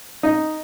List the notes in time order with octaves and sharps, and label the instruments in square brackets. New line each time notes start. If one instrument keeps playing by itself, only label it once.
[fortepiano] D#4